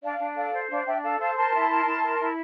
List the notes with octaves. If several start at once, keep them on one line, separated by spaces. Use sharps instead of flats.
D4 D5 F5
D4
A4 D5 F5
C5
D4 D5 F5
D4 E5 G5
A4 F5 A5
C5 F5 A5
A#4 A5 C6
E4
A#4
E4
A#4
E4